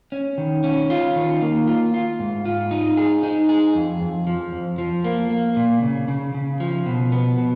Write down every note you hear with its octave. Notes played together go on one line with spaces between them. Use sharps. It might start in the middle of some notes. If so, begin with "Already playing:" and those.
C#4
D#3
C#4
F4
D#3
A#3
F4
F4
G#2
F4
D#4
G#4
D#4
G#4
F2
F2
F3
F2
F3
A#3
A#3
A#2
C#3
C#3
C#3
F3
B2
B3
B2